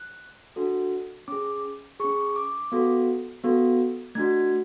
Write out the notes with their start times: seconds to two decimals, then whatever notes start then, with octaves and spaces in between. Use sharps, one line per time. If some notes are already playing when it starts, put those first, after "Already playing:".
Already playing: F#6
0.56 D4 F#4 A4
1.28 C#4 G#4 D6
2.00 C#4 G#4 C#6
2.36 D6
2.72 B3 F#4 A4
3.44 B3 F#4 A4
4.15 A3 D4 F#4 G#6